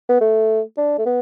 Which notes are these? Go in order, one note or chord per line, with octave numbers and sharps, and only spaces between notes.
B3
A3
D4
A3
B3